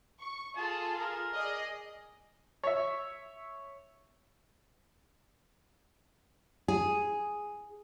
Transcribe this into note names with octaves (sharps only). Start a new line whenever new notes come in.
C#6
F4 G#4 A4 A5
A#4
G#4 D5 D#5
C#5 E5
G#4